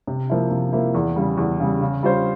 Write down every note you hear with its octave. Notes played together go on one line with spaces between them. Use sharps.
C3
F3 A#3 E4
C3
F3 A#3 E4
E2
C#3 G3
E2
C#3 G3
C#3
G3 C#4 F4 C5